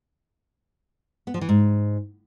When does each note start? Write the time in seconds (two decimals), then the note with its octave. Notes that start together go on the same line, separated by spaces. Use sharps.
1.27 B3
1.34 F3
1.41 E3
1.49 G#2